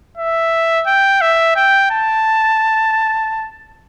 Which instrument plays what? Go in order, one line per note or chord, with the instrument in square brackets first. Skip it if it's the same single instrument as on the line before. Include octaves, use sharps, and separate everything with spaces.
[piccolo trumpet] E5
G5
E5
G5
A5